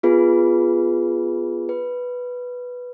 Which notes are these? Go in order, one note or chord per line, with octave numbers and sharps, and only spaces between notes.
B3 F4 G#4 B4
B4